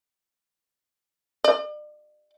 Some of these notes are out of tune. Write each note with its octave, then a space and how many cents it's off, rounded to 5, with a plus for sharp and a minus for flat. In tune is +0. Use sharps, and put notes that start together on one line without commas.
D5 +40